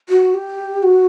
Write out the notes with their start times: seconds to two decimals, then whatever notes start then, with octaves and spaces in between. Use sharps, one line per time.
0.09 F#4
0.34 G4
0.83 F#4